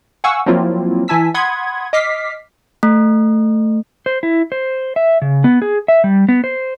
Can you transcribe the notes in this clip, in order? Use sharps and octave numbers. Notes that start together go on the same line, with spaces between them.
F5 F#5 G#5 C#6 E6
F3 F#3 A#3 C4 E4 F4
E3 E4 G#5 A5 E6 B6
F#5 B5 C6 D#6 G#6
D#5 D6 F6 B6 C7
A3
C5
E4
C5
E5
C#3
B3
G#4
E5
G3
B3
C5